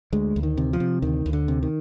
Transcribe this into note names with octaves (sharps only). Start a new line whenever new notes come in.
D2 G#3
D2
D#3
C3
F3
C3
D2 D#3
D2
D3
C3
D#3